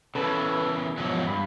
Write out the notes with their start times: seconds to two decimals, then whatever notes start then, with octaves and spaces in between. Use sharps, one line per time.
0.15 C#3 E3 A4 B4 A5
0.98 E2 G#2 F3 F#3
1.27 G2 B5